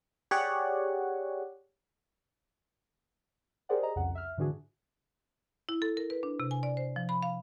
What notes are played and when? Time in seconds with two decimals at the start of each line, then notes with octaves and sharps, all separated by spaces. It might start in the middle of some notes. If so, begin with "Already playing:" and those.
0.31 G4 G#4 C#5 D5 F#5
3.69 G4 G#4 A#4 C5 D5 F#5
3.82 G#4 D#5 A#5
3.96 C2 F2 C#3 F#5
4.15 E5 F6
4.37 G#2 D3 E3 D4 F#4 G#4
5.69 E4
5.82 A4
5.97 A#4
6.10 B4
6.23 D4
6.40 C3
6.51 G#5
6.63 D5
6.77 C5
6.96 F3
7.09 B5
7.23 F5